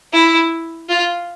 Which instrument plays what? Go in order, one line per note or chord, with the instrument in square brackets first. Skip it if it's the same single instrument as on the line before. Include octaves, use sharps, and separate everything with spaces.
[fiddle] E4
F4